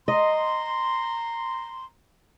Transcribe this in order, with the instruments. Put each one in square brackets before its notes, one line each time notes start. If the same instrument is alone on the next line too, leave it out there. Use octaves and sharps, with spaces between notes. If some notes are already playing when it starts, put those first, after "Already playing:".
[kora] D#5 [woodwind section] A#5 C6